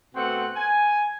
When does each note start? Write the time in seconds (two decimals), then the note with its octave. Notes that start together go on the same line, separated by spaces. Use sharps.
0.15 B2 A3 C4 F#5
0.56 G#5